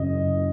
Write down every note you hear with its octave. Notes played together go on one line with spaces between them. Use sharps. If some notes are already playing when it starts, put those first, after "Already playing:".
Already playing: F#1 F#2 C#3 D#5